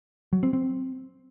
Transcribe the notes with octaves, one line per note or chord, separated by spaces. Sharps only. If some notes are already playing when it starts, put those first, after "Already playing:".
F#3
C4
C4